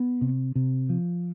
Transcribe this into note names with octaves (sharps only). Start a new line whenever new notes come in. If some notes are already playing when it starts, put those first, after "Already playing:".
Already playing: B3
C3
C3
F3